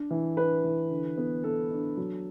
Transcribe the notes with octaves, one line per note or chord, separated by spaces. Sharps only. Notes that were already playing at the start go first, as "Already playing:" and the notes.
Already playing: D4
E3
D4 B4
E3
D3
B3
B3 A4
D4
F#3